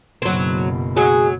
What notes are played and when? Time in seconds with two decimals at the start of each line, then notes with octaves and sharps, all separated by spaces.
0.22 F#1 B2 F#3 C4
0.96 F#3 G#3 G#4